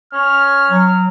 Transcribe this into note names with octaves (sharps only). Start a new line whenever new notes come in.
C#4 F6
F#3